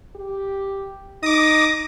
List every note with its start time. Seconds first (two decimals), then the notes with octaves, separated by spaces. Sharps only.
0.16 G4
1.23 D#4 D6 D#6 A#6